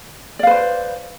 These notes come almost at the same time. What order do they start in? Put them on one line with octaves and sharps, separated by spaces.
D5 F5 B4 C5